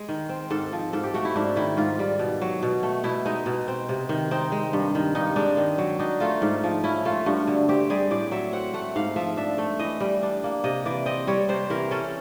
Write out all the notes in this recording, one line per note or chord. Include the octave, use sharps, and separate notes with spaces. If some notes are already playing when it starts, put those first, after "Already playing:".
Already playing: G#3
D#3
C4
G#2 A4
F3
G#2 A4
G4
A3 F#4
E4
G#2 D4
D#3 E4
G#2 F4
G3
B2
F#3
B2
A3
B2 E4
G#3 D#4
B2
C4
C3
D#3
C4 D#4
G#3
G2
D#3
G2 D#4
G#3 D4
D#3
F#3
D4 D#4
A3 F4
G#2
F3
C#4 E4
A3 F4
G2 F#4
D3
C4 G4
G3 G#4
A2 D5
F#3 E5
C4 F#5
A3 F#5
G#2 F5
F3 E5
D4 E5
A3
E3 D#5
G3
D4
A#3
C3 D#5
E3 D5
C4 D#5
G3 C#5
C3 C5
E3 A#4
C#4 A4